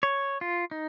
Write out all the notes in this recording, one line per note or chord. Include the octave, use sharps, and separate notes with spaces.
C#5
F4
D#4